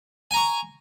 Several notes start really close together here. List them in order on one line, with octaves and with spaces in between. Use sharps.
G#5 A#5 C#6